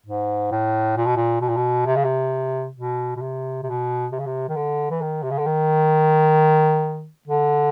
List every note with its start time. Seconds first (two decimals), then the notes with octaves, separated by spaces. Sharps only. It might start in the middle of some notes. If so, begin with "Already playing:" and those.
0.06 G#2
0.51 A2
0.97 A#2
1.06 B2
1.16 A#2
1.41 B2
1.49 A#2
1.56 B2
1.86 C3
1.96 C#3
2.04 C3
2.76 B2
3.16 B2
3.21 C3
3.63 C3
3.66 B2
4.12 C3
4.19 C#3
4.26 C3
4.49 D#3
4.56 D3
4.90 E3
5.01 D#3
5.23 C3
5.31 C#3
5.38 D3
5.46 D#3
7.27 D3